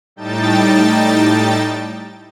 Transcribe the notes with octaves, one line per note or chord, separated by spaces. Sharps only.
A2 G3 D#4 G5 A5 A6